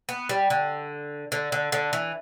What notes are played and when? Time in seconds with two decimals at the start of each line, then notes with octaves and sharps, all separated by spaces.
0.09 B3
0.29 G3
0.50 D3
1.32 D3
1.52 D3
1.72 D3
1.93 E3